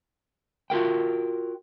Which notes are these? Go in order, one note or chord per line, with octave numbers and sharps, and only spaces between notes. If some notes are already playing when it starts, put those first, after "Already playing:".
F4 F#4 A#4 G5